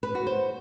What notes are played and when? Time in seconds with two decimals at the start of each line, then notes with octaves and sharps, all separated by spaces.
0.03 B4
0.15 F#4
0.27 C5